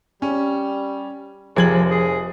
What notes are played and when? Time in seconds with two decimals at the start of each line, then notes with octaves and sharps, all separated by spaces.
0.22 G3 C#4
1.57 F1 F3 G#3 G4 A#4 G#6 F#7
1.91 G#4